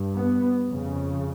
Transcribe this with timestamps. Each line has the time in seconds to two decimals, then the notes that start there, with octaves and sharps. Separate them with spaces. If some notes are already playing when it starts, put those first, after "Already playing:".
Already playing: G2
0.16 B3
0.67 F2 C#3